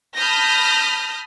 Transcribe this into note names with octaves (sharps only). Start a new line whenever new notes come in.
A5 B5 D#6 F6 G6 A#6